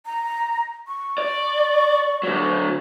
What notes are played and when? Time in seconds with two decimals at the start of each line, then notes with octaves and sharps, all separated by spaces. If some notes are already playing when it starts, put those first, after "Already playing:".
0.06 A#5
0.87 C#6
1.18 D5
2.23 D3 F#3